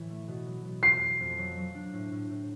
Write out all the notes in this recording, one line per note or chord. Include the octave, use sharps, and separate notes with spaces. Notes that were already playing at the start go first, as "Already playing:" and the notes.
Already playing: A2 E3
A3
B2
F#3
B2
F2 C7
G3
F2
F#3
F#3
D4
A2
A2
A2